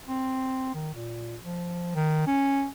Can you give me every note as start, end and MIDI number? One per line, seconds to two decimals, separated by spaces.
0.07 0.69 60
0.74 0.94 51
0.94 1.35 46
1.42 1.94 53
1.95 2.26 51
2.27 2.67 61